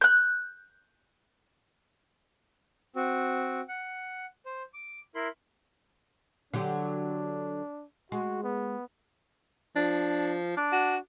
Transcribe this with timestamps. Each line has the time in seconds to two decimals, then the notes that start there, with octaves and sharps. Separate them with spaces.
0.01 F#6 G6
2.96 C4 F#4
3.69 F#5
4.46 C5
4.74 D6
5.15 E4 A#4 B5 C6
6.54 D3 F#3 D4 G4
8.12 G#3 F#4
8.44 B3
9.76 F3 D4
10.57 D4
10.73 F#4